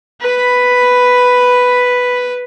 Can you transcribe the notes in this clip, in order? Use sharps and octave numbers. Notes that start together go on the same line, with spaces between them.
B4 B5